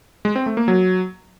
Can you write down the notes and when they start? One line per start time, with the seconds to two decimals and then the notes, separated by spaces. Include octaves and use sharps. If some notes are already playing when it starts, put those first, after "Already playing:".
0.25 G#3
0.36 C4
0.46 A3
0.57 A#3
0.68 F#3